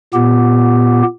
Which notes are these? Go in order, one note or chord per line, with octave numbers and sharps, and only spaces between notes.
A#2 B3 G4